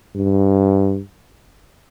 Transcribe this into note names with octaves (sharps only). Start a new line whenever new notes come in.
G2